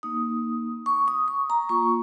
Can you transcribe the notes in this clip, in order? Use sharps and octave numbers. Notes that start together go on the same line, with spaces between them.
A#3 D#4 D#6
C#6
D#6
C#6
A#5
A#3 F4 C#6